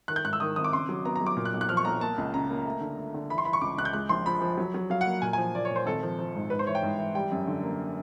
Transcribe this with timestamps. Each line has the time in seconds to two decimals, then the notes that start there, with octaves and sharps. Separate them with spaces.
0.08 D#3 F#6
0.16 G6
0.25 G#2 F#6
0.33 E6
0.40 D#3 D#6
0.56 G#1 D#6
0.64 D6
0.72 C#3 C6
0.89 F#3
1.05 B3 A#5
1.16 A#5
1.21 F#3
1.26 D6
1.37 A#2
1.45 F#6
1.54 B1
1.61 F#6
1.69 F3 F6
1.77 C#6
1.85 B1 A#5
2.01 A#3 A5
2.18 C#2
2.34 C#3 A#5
2.50 A#3
2.65 A3
2.81 D3
2.97 A3
3.14 D3
3.30 E3 B5
3.38 C6
3.45 E3 B5
3.53 C#6
3.61 C#2 D6
3.78 C#2 F#6
3.85 G6
3.93 G#3 F#6
4.09 A#1 C6
4.26 F3 B5
4.42 F3
4.58 F#3
4.74 F#3
4.90 F#3 F5
5.01 F#5
5.06 A#3
5.22 A#2 G#5
5.33 G#5
5.38 F3
5.55 A#2 D5
5.65 C#5
5.70 A#2
5.76 C5
5.86 G#1 A4
6.03 F3
6.19 F3
6.35 G#2
6.50 G#2 B4
6.59 C5
6.67 E3 C#5
6.75 G5
6.83 G#2
6.98 E3
7.15 G3 G5
7.32 F#2
7.47 D3
7.63 A#3